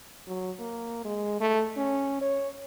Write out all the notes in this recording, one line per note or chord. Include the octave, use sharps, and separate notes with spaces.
F#3
A#3
G#3
A3
C#4
C#5